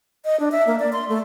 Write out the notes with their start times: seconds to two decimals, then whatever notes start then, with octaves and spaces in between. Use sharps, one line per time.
0.25 D#5
0.40 D4
0.52 E5
0.67 A#3
0.79 D5
0.93 C6
1.09 A3